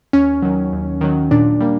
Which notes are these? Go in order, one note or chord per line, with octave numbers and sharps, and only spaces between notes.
D#2 C#4
D#3 F#3
D#2
D#3 F#3
A#2 D4
G3 A#3